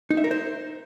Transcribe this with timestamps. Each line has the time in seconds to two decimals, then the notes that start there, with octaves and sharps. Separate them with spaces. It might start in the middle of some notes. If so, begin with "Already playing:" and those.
0.10 D#4
0.17 E5
0.24 A#4
0.31 C5